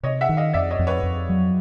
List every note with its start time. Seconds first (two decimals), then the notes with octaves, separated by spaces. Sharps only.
0.03 C3 C#5 D#5
0.21 E5 F#5
0.29 D#3
0.37 D#5 F5
0.53 F2 D5 E5
0.71 C#5 D#5
0.79 F2
0.87 B4 C#5
1.03 F2
1.29 F#3